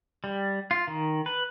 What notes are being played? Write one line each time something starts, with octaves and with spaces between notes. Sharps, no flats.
G3
F4
D#3
B4